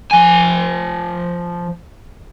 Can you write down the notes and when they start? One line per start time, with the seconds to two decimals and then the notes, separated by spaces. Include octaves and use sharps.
0.11 F3 G#5